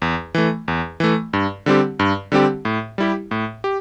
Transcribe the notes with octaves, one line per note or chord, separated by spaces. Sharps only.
E2
E3 A3
E2
E3 A3
G2
D3 G3 C4 G4
G2
D3 G3 C4 G4
A2
G3 E4 G4
A2
G4